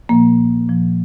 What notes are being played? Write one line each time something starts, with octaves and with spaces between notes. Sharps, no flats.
A#2 F3 A#3
A#2 F3